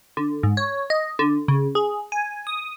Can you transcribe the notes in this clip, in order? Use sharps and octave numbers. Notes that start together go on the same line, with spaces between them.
D3
G#2
C#5
D#5
D3
C#3
G#4
G#5
D#6